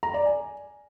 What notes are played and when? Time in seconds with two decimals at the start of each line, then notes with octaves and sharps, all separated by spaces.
0.03 A#5
0.14 D5
0.25 G#5